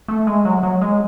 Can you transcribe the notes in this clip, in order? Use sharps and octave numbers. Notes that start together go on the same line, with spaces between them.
A3
G#3
F#3
F#3
G#3